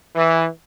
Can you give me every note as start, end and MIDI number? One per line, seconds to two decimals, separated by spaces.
0.16 0.46 52